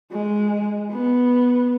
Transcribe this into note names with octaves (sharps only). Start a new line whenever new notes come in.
G#3
B3